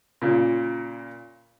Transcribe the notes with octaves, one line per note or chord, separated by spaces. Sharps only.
A#2 C#3